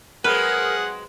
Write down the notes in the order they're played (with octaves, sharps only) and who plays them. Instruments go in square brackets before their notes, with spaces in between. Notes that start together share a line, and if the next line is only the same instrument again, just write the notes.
[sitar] F#3 G#3 C4 [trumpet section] G#4 F#5 [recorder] A#4 [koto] B4